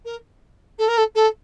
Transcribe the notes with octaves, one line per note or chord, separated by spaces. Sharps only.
A#4
A4
A#4
A4
A4